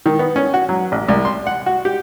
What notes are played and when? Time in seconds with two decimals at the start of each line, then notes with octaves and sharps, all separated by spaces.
0.06 D#3
0.19 B3
0.36 C#4
0.54 F#4
0.69 F#3
0.92 A1
1.09 C2
1.25 C6
1.47 F#5
1.66 F#4
1.85 G4